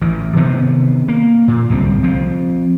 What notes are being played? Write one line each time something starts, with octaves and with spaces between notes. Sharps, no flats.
A1 E3
C3 D#3 B3 C4
A#3
A#2
D1 C2 G3 C4
F3 C4